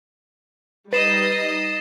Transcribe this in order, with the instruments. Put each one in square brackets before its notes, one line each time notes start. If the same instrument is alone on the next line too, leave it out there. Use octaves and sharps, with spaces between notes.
[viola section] G3 D#4 [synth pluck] B4 [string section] D#5 [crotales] A6 C7 E7